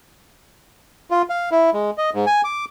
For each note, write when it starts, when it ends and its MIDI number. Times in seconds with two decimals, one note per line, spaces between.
1.11 1.22 65
1.29 1.49 77
1.52 1.70 64
1.74 1.91 56
1.98 2.10 75
2.14 2.25 44
2.27 2.42 80
2.44 2.65 86